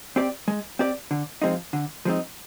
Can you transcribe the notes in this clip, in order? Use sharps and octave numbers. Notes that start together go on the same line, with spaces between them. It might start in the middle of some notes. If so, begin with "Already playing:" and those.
C4 G4 D5
G#3
C4 G4 D5
D3
F3 G#3 C4 D#4
D3
F3 G#3 C4 D#4